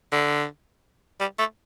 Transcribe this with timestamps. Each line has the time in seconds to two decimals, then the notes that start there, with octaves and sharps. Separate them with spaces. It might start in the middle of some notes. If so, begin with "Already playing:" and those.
0.12 D3
1.20 G3
1.38 A3